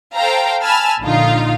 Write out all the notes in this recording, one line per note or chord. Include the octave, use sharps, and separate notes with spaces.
A4 C5 F5 G5 A#5
G#5 A5 B5 E6 F6
A#1 D3 D#4 F4 F5